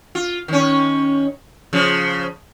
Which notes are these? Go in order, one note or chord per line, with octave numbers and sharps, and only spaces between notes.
F4
D#3 C#4
C#3 F3